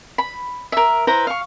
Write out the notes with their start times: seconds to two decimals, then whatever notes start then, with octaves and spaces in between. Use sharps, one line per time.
0.18 B5
0.72 A#4 E5
1.07 E4 B4 C5 A#5
1.27 F5 C#6